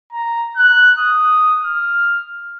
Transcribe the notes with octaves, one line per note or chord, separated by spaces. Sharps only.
A#5
F#6
D#6
F6